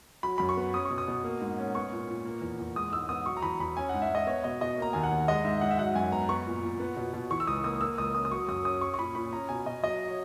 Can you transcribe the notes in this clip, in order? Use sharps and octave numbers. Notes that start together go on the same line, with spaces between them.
F#3 B5
F#2 B5
C#6
B3
C#4 D#6
C#6
B2
D#6
B2
A#3
G#2
C#4
B3 C#6
A#2
A#2
A#3
E2
E2
G#3 D#6
G#2 E6
B3 D#6
F#3 C#6
A#5
E2 B5
E2 B5
C#4 G#5
G#2 F#5
E5
G#2 D#5
B3 C#5
B2 D#5
B2 D#5
A#3 A#5
D#2 G#5
F#5
D#2
G#3 D#5
G#2 E5
G#2 F#5
E5
F#3 F#5
F#2 G#5
B3 A#5
B3 C#6
A#2
A#2
B3
B2
B2
E3 C#6
E6
C#2 D#6
A#3 D#6
A#3 E6
C#2 D#6
C#4 D#6
D#6
F#3 C#6
F#2 D#6
C#4 D#6
C#4 C#6
C#6
A#2 B5
A#2 B5
C#4 A#5
B2 G#5
B2 D#5
F#3 D#5
C#5